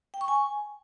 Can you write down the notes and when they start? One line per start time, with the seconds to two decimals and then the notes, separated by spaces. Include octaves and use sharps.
0.14 G5
0.21 C#6
0.28 G#5